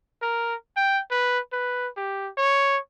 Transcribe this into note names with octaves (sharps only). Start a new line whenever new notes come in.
A#4
G5
B4
B4
G4
C#5